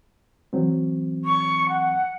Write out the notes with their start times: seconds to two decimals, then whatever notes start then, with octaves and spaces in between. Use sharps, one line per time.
0.53 E3 F#3 C4
1.25 C#6
1.69 F#5